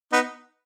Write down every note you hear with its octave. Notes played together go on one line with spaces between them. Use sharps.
B3 D#4